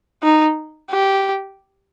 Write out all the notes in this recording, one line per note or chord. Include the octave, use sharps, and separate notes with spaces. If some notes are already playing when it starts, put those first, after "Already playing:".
D#4
G4